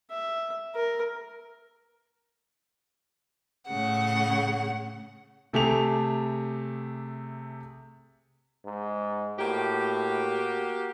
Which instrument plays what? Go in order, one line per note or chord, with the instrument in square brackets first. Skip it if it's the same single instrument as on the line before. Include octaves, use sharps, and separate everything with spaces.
[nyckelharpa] E5
A#4
[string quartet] A2 C#3 F#5
[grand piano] C3 A3 G4 G#4 A5 F7
[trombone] G#2
[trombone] A2 [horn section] A#3 F#4 G4